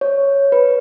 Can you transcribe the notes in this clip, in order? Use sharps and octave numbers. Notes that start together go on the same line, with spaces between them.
C#5
B4